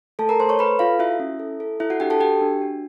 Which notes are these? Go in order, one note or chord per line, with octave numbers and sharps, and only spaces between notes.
A3 A4 A5
A#4 A#5
A3 C5 C6
C#5 C#6
A4 B4 B5
F4 A4 F5
E4 F#4 E5
C#4
A4
A4
E4 A4 E5
F#4 F#5
D4 G4 G5
A4 A5
F#4 G4 G5
D4
F#4